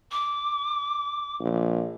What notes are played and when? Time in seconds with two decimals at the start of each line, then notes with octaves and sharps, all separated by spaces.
0.12 D6
1.40 A#1